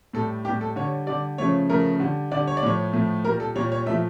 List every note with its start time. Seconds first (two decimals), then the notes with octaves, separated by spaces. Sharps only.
0.13 A2 G3 A4
0.45 A2 G3 G4
0.61 A4
0.76 D3 G3 C#5
1.07 D3 G3 D5
1.38 C#3 F3 A3 C#5
1.70 C#3 F3 A3 A#4
2.00 D3 G3
2.32 D3 G3 D5
2.47 C#5
2.57 D5
2.63 A2 F3 A3 C#5
2.93 A2 F3 A3
3.25 A#2 G3 A#4
3.40 A4
3.56 A#2 G3 C#5
3.72 C#5
3.86 A#2 F3 A3 E5